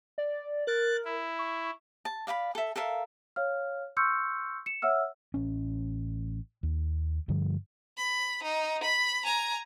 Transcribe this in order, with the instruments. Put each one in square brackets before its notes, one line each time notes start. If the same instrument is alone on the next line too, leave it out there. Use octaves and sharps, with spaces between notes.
[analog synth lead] D5
[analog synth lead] A#4 [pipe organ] F#6 A6
[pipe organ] E4
[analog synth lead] C#6
[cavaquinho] A5
D5 F5 A#5 B5
A4 E5
A4 A#4 E5 F5
[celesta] C#5 F5 F6
C6 C#6 E6 F6 G6 C#7
C#7 E7
C#5 E5 F#5 E6 F6
[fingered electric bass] A1 C#4
D#2
G2 D3 F3 G3
[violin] B5
D#4
B5
G#5 A#5